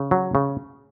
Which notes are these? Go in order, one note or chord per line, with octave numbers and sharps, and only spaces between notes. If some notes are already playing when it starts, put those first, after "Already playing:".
Already playing: C#3
F#3
C#3